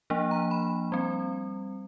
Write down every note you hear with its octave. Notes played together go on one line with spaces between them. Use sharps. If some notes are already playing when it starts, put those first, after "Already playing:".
F3 A#3 D4
A#5
B5
G3 C4